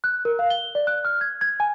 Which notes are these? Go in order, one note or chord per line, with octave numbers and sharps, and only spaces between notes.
F#6
A#4
F5
G7
D5
F#6
F6
G#6
G#6
G#5